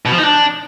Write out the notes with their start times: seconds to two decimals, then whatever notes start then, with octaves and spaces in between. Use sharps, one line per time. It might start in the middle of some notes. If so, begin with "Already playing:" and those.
0.06 B2
0.12 F3
0.18 D#4
0.25 D4